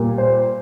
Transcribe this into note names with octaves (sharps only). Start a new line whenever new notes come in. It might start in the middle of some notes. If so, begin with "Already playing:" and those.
Already playing: A#2 G3 A#3
C5